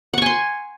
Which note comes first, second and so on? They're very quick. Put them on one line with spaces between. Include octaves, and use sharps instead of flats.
F#5 C#6 G#5 C6